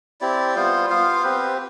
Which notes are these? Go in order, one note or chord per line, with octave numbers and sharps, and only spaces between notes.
C4 E4 G4 D5
G3 B3 F4 C5
B3 F4 C5 F5
C4 G4 B4